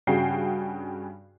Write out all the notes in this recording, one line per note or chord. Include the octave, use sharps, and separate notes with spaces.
G2 C#3 F#4 G#4 G5 C7